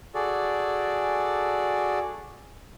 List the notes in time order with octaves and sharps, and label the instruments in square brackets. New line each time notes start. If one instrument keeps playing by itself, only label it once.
[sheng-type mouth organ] F#4 G#4 A4 D5